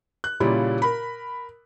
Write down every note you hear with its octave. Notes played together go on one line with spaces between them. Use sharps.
F#6
A#2 C#3 G3 C#4 E4 F4
A#4 B5